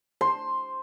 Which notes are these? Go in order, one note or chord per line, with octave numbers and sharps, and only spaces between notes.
C5 C6